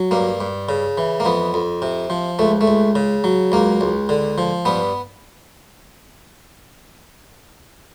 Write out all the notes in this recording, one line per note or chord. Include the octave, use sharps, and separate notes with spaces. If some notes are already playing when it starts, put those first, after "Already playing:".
Already playing: F#3
G2 A#3
G2
C#3
E3
A#3
F2 B3
F2
C3
F3
C#2 A3
A3
C#2
C#3
F#3
C#2 A#3
C#2
D3
F3
G2 B3